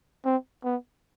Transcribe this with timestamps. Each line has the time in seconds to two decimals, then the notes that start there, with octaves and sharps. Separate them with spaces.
0.25 C4
0.64 B3